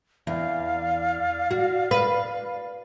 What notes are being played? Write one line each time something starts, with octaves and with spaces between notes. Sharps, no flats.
E2 D5 F5
F#4
B4